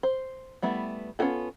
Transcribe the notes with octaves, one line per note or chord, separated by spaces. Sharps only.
C5
G3 A3 B3 E4
B3 C#4 F4 F#4 A4